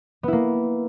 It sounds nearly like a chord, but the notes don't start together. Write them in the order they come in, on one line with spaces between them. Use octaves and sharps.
B3 E4 A#3